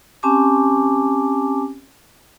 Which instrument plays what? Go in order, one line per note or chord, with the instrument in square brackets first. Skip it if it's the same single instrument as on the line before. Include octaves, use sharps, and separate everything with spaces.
[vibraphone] C4 C#4 G4 G#5 A5 D6